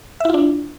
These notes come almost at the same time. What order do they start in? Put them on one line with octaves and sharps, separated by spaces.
E5 E4 F4 D4